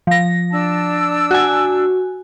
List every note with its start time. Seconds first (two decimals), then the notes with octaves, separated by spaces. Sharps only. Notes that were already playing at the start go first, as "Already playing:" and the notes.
0.07 F3 A#6
0.51 D4 A5 E6
1.31 F#4 G#5